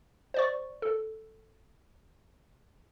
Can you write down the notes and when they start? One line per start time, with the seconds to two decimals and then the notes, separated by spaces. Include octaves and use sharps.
0.34 C5 D5 C#6
0.82 A4